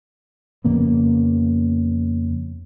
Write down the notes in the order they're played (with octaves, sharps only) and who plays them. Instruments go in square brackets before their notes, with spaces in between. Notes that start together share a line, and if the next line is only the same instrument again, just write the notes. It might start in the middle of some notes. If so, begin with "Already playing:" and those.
[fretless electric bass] F2 C#3 A#3 B3